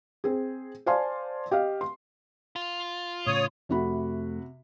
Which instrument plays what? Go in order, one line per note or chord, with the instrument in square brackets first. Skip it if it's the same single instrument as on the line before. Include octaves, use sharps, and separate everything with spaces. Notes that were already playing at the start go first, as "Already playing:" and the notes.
[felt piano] C4 G#4
C5 D5 F5 G#5 A5 C6
G4 D#5 F5
C6
[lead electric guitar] F4
[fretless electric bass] A2 C#3 [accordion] C#5 D#6
[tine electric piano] F2 A3 [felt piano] C3 F#4 B5